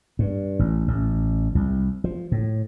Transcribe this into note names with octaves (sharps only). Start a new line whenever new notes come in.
G2
A1
A1
C2
F3
A2